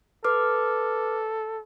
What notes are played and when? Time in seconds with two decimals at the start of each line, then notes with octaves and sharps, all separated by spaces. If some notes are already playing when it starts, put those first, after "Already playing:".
0.24 A4 B4 D6 F6